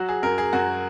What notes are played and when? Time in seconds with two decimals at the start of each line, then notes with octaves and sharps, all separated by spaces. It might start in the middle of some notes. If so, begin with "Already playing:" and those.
Already playing: F#3 F#4
0.09 G#4
0.23 F#2 A#4
0.38 G#4
0.53 F#2 F#4